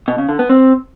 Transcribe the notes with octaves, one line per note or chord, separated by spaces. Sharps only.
B2
C#3
D3
B3
C4